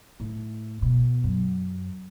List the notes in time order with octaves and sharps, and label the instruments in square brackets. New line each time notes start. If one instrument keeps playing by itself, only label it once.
[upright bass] A2
B2
F#2